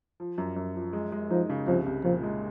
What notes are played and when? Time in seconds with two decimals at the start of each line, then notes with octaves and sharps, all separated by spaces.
0.20 F3
0.38 F#2
0.56 F#2
0.75 F3
0.93 G#3
1.12 G#3
1.30 F3 D#4
1.50 C#3
1.67 C2 F3
1.86 C2
2.04 A#2 F3
2.23 G#3